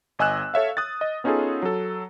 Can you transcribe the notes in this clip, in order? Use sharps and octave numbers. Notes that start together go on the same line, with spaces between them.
G1 D#5 G#5 E6 F#6 E7
A4 C#5 E5 F5
D#6 F#6 A6
D#5
B3 C#4 D#4 F4 G#4 A4
F#3 A4